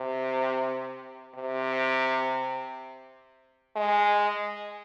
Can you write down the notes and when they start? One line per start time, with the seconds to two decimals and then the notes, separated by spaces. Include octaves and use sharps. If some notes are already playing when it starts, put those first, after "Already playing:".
Already playing: C3
1.35 C3
3.76 G#3